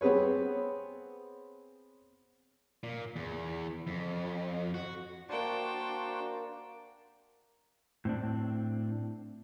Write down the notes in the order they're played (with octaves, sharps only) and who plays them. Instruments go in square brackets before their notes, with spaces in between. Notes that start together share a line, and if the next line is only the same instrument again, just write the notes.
[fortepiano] B3 C4 G#4 B4 C#5
[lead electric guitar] A#2
E2
F2
F#4
[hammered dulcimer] A#3 D5 [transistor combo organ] D4 F#4 C5 [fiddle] G5 A5
[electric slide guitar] A2 C4 D4